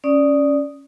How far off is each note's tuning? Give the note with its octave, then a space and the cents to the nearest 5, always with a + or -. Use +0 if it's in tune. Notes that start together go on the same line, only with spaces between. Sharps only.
C#4 +0 D5 +0 D#6 +0